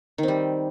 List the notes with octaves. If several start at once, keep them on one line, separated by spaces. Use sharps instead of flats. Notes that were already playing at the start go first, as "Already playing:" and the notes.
D#3 G3 C4